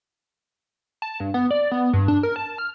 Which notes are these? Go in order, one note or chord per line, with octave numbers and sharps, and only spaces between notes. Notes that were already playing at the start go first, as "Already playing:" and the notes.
A5
G2
B3
D5
B3
G2
D4
A#4
A5
F6